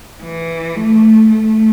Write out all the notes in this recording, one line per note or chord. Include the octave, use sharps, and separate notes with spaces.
E3
A3
A3